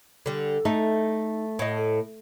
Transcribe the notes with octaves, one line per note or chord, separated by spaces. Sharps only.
D3 G3
A3 D#4
A2 D#5